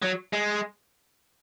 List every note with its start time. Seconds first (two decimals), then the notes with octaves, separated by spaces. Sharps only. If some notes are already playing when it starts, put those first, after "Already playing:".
0.03 F#3
0.33 G#3